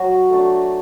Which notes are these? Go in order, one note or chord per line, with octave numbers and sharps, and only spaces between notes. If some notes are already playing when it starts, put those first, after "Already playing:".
Already playing: F#3 F#4
A3 D4